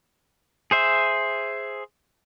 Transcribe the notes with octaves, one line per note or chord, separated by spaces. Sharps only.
G#4 C5 E5